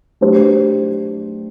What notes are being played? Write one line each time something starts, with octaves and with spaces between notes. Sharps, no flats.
F#3 A3 D4 G4 C5